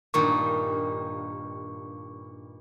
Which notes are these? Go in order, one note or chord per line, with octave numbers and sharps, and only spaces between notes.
G2 A#2 D#3 C#6